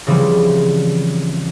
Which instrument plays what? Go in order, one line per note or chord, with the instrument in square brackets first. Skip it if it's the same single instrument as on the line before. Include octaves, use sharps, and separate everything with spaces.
[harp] C#3 E3 F3 G3 C4